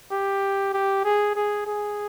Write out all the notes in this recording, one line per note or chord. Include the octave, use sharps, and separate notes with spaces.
G4
G4
G#4
G#4
G#4